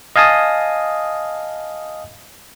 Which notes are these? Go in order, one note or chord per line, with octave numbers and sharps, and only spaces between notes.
D#5 F5 G#5 A5 D#6